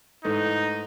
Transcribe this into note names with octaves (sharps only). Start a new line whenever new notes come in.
G#2 E3 A3 D#4